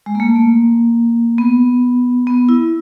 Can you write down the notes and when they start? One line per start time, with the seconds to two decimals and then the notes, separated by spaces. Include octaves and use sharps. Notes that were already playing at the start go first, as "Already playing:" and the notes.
0.06 G#3
0.15 A#3
0.20 A3
0.36 A#3
1.38 B3
2.27 B3
2.49 E4